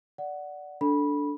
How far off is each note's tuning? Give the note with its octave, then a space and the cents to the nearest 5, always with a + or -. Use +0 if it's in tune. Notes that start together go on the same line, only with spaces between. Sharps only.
D5 -5 F#5 +5
D4 -10 A4 +0 B5 -15